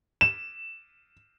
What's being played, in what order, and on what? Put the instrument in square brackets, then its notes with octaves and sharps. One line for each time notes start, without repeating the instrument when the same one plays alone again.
[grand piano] E7